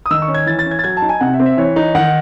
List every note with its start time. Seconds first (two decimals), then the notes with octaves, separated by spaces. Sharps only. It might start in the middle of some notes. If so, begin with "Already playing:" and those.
0.06 D#6
0.11 D#3 E6
0.22 C#6
0.28 C#4
0.34 G#6
0.46 E3 A6
0.59 A6
0.65 C#4
0.71 G#6
0.79 A6
0.84 F#3 G#6
0.97 A5
1.02 D#4
1.09 G#5
1.21 C3 F#5
1.34 E5
1.39 C4
1.46 E5
1.58 E3 C#5
1.76 D#4
1.95 D#3 F#5